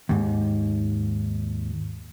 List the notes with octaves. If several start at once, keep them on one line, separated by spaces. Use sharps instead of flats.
D#2 G#2